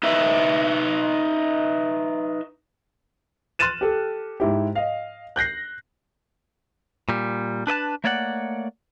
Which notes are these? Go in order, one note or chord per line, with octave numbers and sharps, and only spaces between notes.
D#4 B4 E5
C6 F6 F#6 A6 D#7 E7
G4 A4
G#2 E4 G4
D#5 F5
F#6 G6 A#6 C7
A#2 G3
D4 B4 D#5 A5
A3 A#3 C#5 D5 E5 F#5